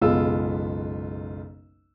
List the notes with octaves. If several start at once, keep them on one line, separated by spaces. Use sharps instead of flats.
F#1 B1 G#3 B3 F4 E6